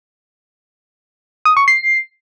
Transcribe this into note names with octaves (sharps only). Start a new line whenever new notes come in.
D#6
C#6
C7